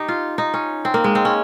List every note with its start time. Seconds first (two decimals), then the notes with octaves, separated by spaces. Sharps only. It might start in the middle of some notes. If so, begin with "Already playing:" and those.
Already playing: D#4 G4
0.08 F4
0.38 D#4
0.54 C#4
0.85 C4
0.94 A#3
1.04 G#3
1.15 C4
1.25 C#4